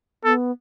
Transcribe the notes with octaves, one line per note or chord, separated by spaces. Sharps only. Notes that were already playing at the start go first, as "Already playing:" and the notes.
B3 A4